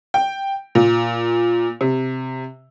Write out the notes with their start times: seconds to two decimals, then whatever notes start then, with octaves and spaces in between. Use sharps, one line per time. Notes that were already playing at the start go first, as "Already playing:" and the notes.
0.14 G5
0.75 A#2
1.81 C3